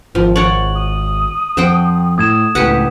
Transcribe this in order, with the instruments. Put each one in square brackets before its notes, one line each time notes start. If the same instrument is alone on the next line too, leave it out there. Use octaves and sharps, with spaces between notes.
[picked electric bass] G#1 [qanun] F3
[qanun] C#5 D5 F#5 [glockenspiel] F#7
[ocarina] D#6
[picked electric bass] F2 [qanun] C5 F#5 G5
[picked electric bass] A2 [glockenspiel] D#6 G#6 E7
[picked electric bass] C#2 A2 [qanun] G4 B4 F#5